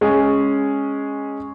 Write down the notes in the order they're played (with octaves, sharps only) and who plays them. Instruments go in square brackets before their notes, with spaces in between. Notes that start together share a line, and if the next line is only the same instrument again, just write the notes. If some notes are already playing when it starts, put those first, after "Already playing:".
[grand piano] G#3 C#4 G#4